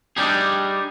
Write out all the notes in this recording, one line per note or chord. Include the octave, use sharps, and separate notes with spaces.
G3 D4 D#4 G4 G#4